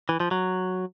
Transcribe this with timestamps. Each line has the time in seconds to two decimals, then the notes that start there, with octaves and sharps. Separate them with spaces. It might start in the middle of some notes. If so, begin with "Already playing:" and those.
0.09 E3
0.20 F3
0.31 F#3